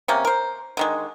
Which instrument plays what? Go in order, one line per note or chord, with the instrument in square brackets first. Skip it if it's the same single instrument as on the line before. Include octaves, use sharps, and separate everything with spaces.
[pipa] C3 A#3 C#4
A#4 C5
D3 D#3 G#3